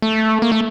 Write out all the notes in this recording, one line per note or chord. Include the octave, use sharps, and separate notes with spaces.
A3
A#3
A3